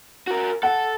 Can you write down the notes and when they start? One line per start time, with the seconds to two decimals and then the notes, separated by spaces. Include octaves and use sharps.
0.27 F#4 A#4
0.63 A4 F#5